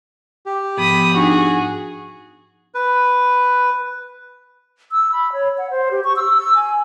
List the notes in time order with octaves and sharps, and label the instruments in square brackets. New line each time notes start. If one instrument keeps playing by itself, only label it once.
[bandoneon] G4
[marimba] G#2 F3 B3 [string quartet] B5 D#6
[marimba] D4 D#4 [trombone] F#4 [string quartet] G#4
[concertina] B4
[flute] E6
B5
C#5
F#5
C5
G4
C#6
E6
E6
G#5